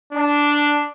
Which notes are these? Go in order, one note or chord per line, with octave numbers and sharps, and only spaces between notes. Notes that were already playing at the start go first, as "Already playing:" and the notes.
D4